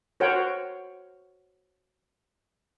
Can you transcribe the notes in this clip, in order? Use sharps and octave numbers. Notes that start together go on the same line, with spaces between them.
F#4 A#4 C5 C#5 F#5 G5